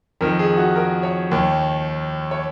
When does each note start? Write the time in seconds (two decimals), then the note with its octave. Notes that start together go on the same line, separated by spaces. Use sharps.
0.21 F2 D#3 A#4
0.39 G#4
0.57 F#4
0.76 A#4
1.03 C#5
1.31 D#2 D#3
2.31 C#5